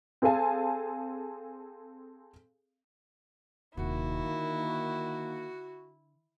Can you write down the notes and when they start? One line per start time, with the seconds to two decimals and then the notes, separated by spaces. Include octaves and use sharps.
0.22 C4 G#4 A4 F5 G#5 A5
3.77 D#1 C3 D#3 A#3 E4 F#4
4.26 D3